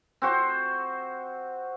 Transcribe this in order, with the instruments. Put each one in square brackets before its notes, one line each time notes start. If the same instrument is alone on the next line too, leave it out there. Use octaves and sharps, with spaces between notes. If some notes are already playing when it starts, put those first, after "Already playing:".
[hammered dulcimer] C4 F#4 C5